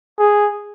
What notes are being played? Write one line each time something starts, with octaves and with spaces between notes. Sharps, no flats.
G#4